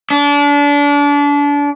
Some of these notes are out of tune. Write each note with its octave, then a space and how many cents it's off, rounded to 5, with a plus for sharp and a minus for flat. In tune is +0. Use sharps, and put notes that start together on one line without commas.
D4 -30